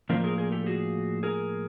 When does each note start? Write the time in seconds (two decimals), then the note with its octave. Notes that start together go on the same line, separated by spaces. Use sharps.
0.09 A2 F3 A#3 D4 F4 A#4 C5
0.24 G#4 A#4
0.38 G#4 A#4
0.52 G4 A4
0.66 F#4 G#4
1.23 G#4 A#4